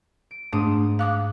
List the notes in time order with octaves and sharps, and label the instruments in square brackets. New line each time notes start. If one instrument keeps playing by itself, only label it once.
[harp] D7
[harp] G#2 D#6 [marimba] A3 D4
[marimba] F5 D6 D#6 [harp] F#6